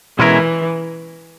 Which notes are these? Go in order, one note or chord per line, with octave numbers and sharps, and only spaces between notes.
B2 E3 G#3 C#4 E4 A#4